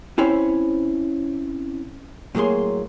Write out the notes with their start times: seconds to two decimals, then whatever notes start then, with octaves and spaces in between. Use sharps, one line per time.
0.18 C4 C#4 E4 C5 C#5
2.35 A2 F#3 A#3 G#4 C6